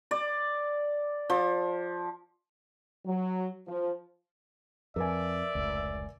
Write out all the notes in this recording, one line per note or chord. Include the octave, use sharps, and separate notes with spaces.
D5
F3
F#3
F3
F2 A#4 B4 D5 E5 G#5
F1 C#2